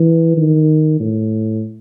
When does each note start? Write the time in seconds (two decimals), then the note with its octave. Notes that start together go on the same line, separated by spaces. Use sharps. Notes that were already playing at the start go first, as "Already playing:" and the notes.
Already playing: E3
0.37 D#3
1.00 A2